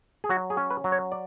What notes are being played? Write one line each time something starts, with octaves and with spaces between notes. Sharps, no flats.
G#4
F#3 F#4
G#4
C#4
B4
F#3
C#5
D5